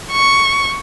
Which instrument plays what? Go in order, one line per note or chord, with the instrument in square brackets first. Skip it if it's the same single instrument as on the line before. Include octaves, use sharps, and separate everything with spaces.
[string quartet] C#6